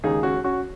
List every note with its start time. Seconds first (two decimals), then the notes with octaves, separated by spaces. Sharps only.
0.04 D#2 C#3 G#3 D#4 G#4
0.23 C#4 F#4
0.44 C#4 F#4